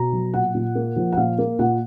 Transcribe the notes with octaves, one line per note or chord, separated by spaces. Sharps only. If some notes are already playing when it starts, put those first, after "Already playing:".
Already playing: B2 A#5
F#3
A#2 F#5
A#2
A#3
F3
F#5
A#2 F5
A#3
A#2 F#5